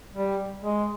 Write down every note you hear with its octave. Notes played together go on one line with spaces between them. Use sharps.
G3
G#3